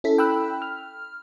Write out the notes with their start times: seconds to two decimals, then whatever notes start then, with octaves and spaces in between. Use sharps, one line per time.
0.04 C#4 E4 A4 B6
0.18 G5 B5 E6 F#6
0.62 F6